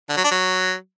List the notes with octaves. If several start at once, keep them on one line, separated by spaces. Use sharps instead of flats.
D3
F#3
D4
F#3